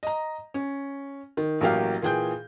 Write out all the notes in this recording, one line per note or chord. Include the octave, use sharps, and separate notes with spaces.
D#5 A#5
C#4
D#3
A1 F#3 A#3 G4 F5
A#2 E3 G#4 G5 G6